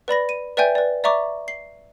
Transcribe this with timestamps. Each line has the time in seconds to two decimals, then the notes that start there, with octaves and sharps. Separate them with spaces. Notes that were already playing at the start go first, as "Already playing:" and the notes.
0.08 B4 D5 B5 A#6
0.29 D#7
0.57 B4 D5 E5 G5 G#5 G6
0.75 B4 D5
1.04 D5 E5 A#5 C#6 D6
1.48 C7